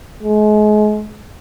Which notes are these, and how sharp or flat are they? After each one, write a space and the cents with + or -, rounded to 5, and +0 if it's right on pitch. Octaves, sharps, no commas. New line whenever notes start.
G#3 +35